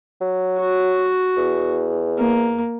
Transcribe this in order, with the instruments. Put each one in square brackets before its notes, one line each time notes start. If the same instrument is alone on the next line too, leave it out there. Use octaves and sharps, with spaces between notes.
[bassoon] F#3
[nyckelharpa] F#4
[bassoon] E2
[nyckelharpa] A#3